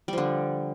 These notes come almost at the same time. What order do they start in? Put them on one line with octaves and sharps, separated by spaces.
G3 F3 D3